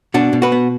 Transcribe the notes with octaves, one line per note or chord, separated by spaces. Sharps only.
B2 D4 F#4
B2
F#4 B4
B3